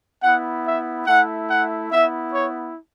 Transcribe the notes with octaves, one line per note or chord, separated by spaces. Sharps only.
B3 E4 F#5
E5
A3 E4 F#5
F#5
B3 E4 E5
C#5